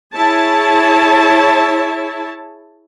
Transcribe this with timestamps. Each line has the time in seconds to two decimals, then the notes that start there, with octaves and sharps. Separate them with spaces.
0.14 E4 G#4 C#5 A5